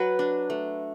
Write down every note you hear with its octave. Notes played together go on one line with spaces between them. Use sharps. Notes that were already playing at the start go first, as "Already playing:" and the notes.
Already playing: F#3 B4
D4
A3